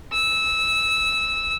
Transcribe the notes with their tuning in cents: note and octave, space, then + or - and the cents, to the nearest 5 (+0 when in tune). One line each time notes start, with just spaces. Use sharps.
E6 -15